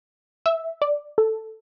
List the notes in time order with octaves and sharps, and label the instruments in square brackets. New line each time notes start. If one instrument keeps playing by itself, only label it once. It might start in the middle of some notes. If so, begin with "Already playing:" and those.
[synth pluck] E5
D5
A4